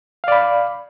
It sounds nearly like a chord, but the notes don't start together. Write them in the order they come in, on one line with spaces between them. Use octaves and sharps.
F5 D5 B5